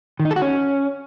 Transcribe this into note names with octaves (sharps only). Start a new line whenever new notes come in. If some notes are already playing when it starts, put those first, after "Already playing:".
D#3
D#4
A4
F#4
C#4